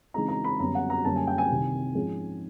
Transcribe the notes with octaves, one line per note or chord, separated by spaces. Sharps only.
C#3 E3 G#3 C4 D#4 A#5
A#5
B5
F#2 D3 G3 B3 A#5
F#5
A#5
F#2 D3 G3 A#3 A5
G#5
G5
G#5
C2 C3 D#3
G#2 F3 G#3 C#4